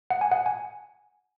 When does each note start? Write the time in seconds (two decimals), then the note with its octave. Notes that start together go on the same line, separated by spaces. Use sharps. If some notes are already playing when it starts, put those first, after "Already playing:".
0.10 F#5
0.21 G#5
0.32 F#5
0.46 G#5